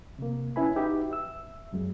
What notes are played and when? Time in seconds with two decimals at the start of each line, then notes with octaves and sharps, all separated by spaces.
0.19 C3 A#3
0.56 C#4 E4 B4 G#5 B5
0.76 D#4 F#4 G4 B4 E5
1.11 E5 E6
1.73 F#2 F#3 G#3